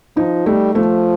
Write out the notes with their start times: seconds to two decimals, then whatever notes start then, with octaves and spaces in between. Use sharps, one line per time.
0.17 F3 D#4
0.46 G3 A3
0.75 F3 A3